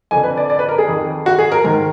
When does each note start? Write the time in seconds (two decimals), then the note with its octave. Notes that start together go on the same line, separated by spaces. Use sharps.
0.11 F2 D3 G#5
0.24 B4
0.37 D5
0.50 D5
0.59 B4
0.69 A#4
0.78 G#4
0.88 F2 D#3
1.26 F#4
1.39 G#4
1.52 A#4
1.64 G#2 D#3 A#4